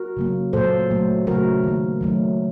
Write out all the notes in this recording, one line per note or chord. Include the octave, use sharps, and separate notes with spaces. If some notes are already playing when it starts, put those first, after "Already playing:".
Already playing: F#4 A#4
C#3 F#3 A#3
A#2 F#3 A#3 A4 C5
A#2 F#3 A3
C#3 F#3 A3 F#4 A#4
D#3 A#3
D#3 F#3 A3